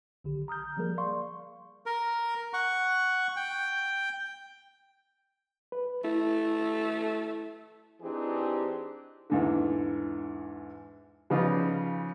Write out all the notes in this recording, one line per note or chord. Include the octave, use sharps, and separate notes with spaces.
B1 D3 G4
A#5 D#6 F6 G6
F3 G3 A#3 G#4 A#4
D5 F5 C6 C#6
A#4
F#5 C#6
G5
B4
A3 E4
E3 C4 D4 D#4 G4 G#4
E2 G#2 D3
C#3 F3 G3 B3 D#4 F4